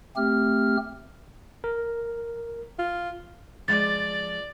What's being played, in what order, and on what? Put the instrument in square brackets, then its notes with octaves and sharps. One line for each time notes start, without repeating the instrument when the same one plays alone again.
[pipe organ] A3 C4 G4 F6
[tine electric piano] A#4
[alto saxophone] F4
[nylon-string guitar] F3 G#3 [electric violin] D5 [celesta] A6